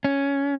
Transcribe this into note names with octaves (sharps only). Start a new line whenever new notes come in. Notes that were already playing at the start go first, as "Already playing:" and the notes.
C#4